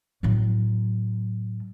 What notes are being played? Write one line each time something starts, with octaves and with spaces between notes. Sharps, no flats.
A2 F#3